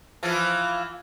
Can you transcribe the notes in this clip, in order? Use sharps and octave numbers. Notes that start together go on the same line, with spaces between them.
E3 F3 F4